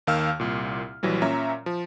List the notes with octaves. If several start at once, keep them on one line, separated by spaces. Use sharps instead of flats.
D#2 D#3 F5 E6 F6
C2 A#2
A#1 E3 F#3 G3
A#2 C#4 E5 A#5
F3